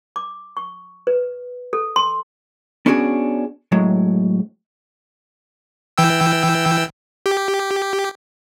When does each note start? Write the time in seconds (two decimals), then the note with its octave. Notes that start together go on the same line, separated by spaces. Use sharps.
0.16 D6
0.57 C#6
1.07 B4
1.73 A4
1.96 C6
2.86 B3 C#4 D4 F#4 G#4
3.72 A2 F#3 G#3
5.98 E3 G5 E6
7.26 G4